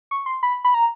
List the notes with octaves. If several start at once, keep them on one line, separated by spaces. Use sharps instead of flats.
C#6
C6
B5
B5
A#5